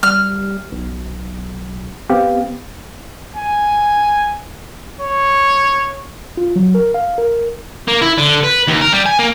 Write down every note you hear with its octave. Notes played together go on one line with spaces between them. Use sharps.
G3 F6
B1
B3 C4 G4 F5
G#5
C#5
F4
F#3
A#4
F5
A#4
A#3
E4
D3
B4
D#2
A#4
G3
G#5
A#3